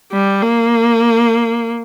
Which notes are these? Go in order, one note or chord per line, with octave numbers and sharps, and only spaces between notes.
G3
A#3